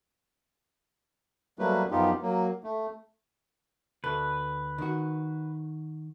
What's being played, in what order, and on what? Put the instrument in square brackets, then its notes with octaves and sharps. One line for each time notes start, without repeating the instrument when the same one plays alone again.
[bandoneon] F#3 G3 A3 A#3 B4
F#2 F3 B3 D#4 F4 G4
F#3 A#3
A3
[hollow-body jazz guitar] D2 A4 [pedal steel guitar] B4
[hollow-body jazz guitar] D#3 F#4